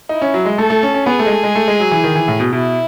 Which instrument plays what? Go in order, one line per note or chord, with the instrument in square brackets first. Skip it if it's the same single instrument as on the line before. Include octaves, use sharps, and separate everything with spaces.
[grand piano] D#4 [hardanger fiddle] E4
[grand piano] C#4
F#3
G#3
[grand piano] A3 [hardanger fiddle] A4
[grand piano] A3
C#4
C#4
[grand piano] B3 [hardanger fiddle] G#4
[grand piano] A3
G#3
A3
G#3
A3
G#3
F#3
E3
D#3
E3
A2
B2
[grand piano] B2 [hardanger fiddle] E4